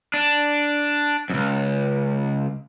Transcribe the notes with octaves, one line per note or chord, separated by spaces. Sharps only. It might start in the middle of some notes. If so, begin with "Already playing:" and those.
D4
C#2 F#2